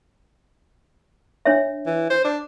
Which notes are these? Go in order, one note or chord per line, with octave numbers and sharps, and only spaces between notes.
D4 C#5 E5
E3
C5
D4